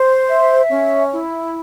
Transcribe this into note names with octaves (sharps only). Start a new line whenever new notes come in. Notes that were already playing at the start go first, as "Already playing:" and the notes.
Already playing: C5
E5
C#4
E4